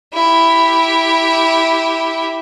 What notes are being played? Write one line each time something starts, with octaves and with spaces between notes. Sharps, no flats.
E4 G4